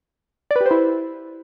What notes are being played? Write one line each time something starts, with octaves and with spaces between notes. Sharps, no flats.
D5
B4
G4
C5
E4